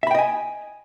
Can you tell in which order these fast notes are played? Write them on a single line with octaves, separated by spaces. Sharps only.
E5 B5 G5 D#5 G#5